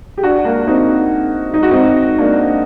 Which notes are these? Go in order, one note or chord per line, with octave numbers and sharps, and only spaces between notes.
G4
D4 F#4
A#3 D4
C4 D#4
D#4
F#4
C4 D#4
A#3 D4